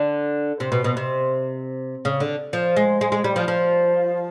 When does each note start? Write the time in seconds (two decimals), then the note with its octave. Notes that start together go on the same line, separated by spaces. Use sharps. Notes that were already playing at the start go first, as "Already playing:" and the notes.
Already playing: D3
0.60 C3
0.72 B2
0.84 B2
0.97 C3
2.05 C#3
2.20 D3
2.53 F3
2.77 G#3
3.01 G#3
3.12 G#3
3.24 G3
3.36 F3
3.48 F3